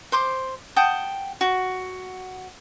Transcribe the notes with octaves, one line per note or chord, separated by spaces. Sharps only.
C5 C6 D6
F#5 G5 A5 D#6
F#4